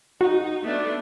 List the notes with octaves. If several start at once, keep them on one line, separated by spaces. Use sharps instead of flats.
D#4 F#4
A3 B3 D4